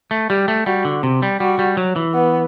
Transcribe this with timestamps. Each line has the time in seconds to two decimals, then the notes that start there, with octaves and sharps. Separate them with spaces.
0.11 A3
0.30 G3 G4
0.48 A3
0.66 G3 F#4
0.85 D3
1.03 C3
1.23 G3
1.40 G3 F#4
1.59 G3
1.77 F#3
1.96 E3
2.14 B3